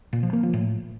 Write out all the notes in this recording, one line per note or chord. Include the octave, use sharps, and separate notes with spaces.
A#2
F3
A#3
F3
A2